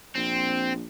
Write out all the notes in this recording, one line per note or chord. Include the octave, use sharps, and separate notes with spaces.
A#1 C4